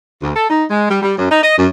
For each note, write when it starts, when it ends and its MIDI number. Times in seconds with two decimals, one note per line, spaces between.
0.23 0.30 38
0.35 0.45 69
0.50 0.63 63
0.70 0.86 56
0.89 0.98 55
1.02 1.14 55
1.17 1.27 42
1.30 1.42 63
1.43 1.57 75
1.57 1.67 42